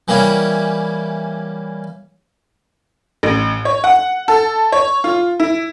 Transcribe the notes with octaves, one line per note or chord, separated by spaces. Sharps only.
E3 G3 A#3 C#4 E4
A1
C#5
F#5
A4
C#5
F4
E4